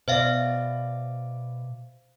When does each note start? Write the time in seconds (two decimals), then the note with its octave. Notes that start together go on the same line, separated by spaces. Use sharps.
0.08 B2 C5 D5 E5 F5